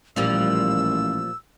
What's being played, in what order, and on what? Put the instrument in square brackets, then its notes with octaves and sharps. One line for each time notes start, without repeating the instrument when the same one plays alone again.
[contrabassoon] A1 [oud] A#2 F3 G3 [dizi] E6